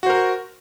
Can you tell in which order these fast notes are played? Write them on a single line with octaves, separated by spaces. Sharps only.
F#4 C5 A#4